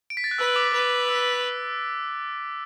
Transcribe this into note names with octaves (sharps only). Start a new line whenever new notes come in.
D7
B6
A6
F#6
B4 E6
D6
B4
E6